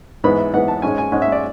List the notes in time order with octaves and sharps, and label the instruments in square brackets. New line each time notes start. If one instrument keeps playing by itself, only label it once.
[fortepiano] G#2 E3 B3 B5
E5
G#2 E3 B3 F#5
A5
G#2 G#3 C#4 G#5
G#5
G#2 G#3 C#4 F#5
E5
D5